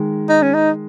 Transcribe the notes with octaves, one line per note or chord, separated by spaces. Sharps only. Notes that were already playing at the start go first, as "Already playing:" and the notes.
Already playing: D#3 G#3
D#4
C#4
D#4